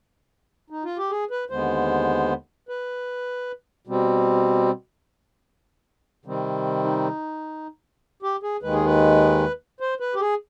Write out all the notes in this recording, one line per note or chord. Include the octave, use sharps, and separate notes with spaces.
D#4
F4
G4
G#4
B4
D#2 D3 G#3 B3 C5
B4
B2 G3 C4
C3 D#3 G3 C4
D#4
G4
G#4
D#2 D#3 G#3 B4
G#4
B4
C5
B4
G4
G#4